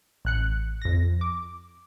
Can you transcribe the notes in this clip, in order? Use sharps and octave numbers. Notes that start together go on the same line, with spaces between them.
A1 F#6 C#7
F2 A#6
D6